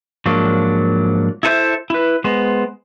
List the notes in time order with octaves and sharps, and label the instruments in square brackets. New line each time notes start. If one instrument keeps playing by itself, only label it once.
[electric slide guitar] G#2 F3 F#3 A#3 D4
E4 F4 A4 B4 C5 E5
E4 B4
G#3 B3 C5